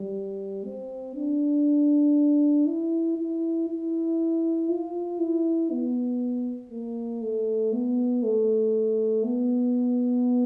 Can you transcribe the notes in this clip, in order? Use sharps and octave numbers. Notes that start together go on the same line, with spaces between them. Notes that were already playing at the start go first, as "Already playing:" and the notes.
Already playing: G3
C4
D4
E4
E4
E4
F4
E4
B3
A#3
A3
B3
A3
B3